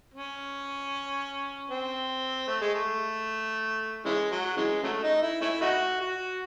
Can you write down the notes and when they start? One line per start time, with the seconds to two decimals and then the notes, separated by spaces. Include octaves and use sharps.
0.14 C#4
1.70 C4
2.48 A3
2.61 G#3
2.74 A3
4.05 C#3 E3 G#3
4.31 F#3
4.57 C#3 E3 G#3
4.83 C#3 F#3 A3
5.03 D#4
5.22 E4
5.41 A3 C#4 E4
5.61 A3 D#4 F#4
6.01 F#4